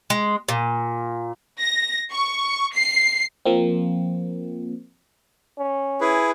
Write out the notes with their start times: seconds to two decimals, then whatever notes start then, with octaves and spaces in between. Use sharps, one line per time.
0.10 G#3
0.49 A#2
1.59 A#6
2.11 C#6
2.74 C7
3.45 F3 A#3 C4
5.58 C#4
6.01 E4 G#4 B4